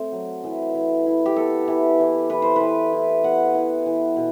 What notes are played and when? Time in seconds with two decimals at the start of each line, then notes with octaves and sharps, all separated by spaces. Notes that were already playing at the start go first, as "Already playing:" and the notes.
Already playing: A3 C4 A4 C5
0.12 F#3
0.44 E3
0.74 E3
1.06 E4
1.26 G4
1.36 B3 A4
1.68 E3
2.00 E3
2.30 E3 B4
2.42 C5
2.56 E3 B4
2.92 E4
3.23 B3 F#5
3.55 E3
3.86 E3
4.17 B2